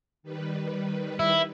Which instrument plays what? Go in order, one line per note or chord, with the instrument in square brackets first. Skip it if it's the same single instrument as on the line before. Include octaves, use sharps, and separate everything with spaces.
[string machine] D#3 G3 B4
[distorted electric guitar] E4